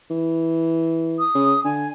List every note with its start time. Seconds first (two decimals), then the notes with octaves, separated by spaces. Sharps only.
0.10 E3
1.19 D#6
1.35 C#3
1.64 D3 G#5